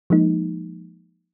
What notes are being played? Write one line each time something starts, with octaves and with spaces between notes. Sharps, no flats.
F3 G#3 A#3 D#4